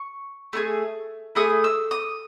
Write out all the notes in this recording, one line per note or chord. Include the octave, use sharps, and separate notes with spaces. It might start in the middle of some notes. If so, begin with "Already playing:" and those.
Already playing: C#6
A3 E4 G#4
A3 E4 G#4 D#6
E6
D#6